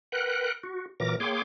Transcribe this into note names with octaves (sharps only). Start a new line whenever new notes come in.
A#4 B4 F#5 G5 F#6
F#4
A#2 E3 F#3 A#4 D6 A#6
A#3 G#4 C#5 G5 C6 D6